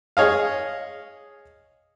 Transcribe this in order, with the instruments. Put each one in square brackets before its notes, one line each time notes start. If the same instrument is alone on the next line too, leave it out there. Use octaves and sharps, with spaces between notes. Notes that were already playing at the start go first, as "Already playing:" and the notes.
[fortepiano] G#4 C#5 D#5 F5